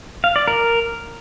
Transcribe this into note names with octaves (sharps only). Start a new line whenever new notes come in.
F5
D5
A#4